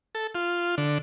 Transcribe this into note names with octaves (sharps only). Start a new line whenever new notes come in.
A4
F4
D3